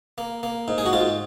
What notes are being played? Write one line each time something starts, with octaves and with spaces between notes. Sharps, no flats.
A#3
A#3
G#2
G#4
F#4
G#2 F4